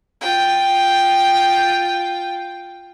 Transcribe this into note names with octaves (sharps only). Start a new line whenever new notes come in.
F4 G5